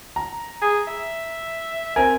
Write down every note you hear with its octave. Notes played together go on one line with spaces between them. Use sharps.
A#5
G#4
E5
C4 A#4 G#5